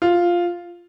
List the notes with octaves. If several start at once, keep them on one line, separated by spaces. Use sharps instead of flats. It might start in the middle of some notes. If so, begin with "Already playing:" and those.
F4